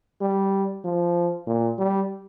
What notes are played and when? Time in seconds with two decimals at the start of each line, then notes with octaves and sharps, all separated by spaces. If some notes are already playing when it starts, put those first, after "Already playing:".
0.21 G3
0.84 F3
1.47 A#2
1.79 G3